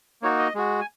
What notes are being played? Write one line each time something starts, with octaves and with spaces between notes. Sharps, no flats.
A#3 D#4 F#4 C#5
D#5
G#3 F#4
G#5